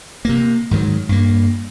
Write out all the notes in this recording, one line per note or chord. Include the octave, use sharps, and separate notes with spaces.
C3 A#3
G#2 D#3 F3 F#3
G2 A#3